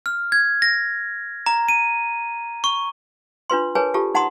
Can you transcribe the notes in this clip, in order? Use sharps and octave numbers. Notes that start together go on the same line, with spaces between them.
F6
G#6
A#6
A#5
D#7
C#6
D4 F4 B4 C6
G#4 A#4 B4 C#5 G#5 A5
F4 G4 A4 A5
D#4 F#5 A5 A#5 C6 D#6